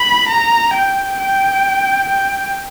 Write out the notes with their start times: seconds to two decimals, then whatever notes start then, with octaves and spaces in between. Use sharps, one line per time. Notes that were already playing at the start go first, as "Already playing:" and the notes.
Already playing: B5
0.29 A#5
0.74 G5
1.20 G5
2.10 G5